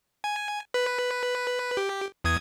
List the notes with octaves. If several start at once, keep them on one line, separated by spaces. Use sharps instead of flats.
G#5
B4
G4
E2 D#6 G#6